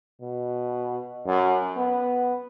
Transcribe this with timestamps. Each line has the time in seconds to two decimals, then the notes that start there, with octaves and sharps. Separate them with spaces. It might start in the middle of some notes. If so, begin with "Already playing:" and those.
0.22 B2
1.27 F#2
1.77 B3